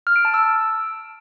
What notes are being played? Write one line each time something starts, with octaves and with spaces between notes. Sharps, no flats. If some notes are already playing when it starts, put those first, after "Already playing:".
F6
D7
A5
E6